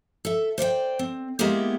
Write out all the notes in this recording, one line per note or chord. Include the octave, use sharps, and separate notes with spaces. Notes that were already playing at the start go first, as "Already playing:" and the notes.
A4 E5
C5 D5 F5 G5
C4
G#3 A#3 B3 E4 G4 G#4